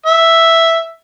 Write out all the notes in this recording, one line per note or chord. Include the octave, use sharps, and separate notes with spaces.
E5